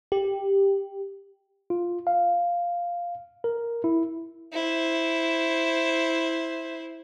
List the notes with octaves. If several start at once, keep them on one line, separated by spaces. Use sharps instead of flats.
G4
F4
F5
A#4
E4
E4 C5